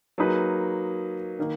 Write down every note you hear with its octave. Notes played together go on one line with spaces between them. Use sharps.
F#3 A#3 D#4 G#4 B4
D#3 A#3 D#4